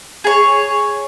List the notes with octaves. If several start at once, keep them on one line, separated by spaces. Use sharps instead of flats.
G#4 C#5